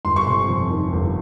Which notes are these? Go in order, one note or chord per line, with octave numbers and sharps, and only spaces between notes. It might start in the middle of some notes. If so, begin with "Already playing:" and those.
G1 C6
C#6
C3 C6
F2
D#3
G1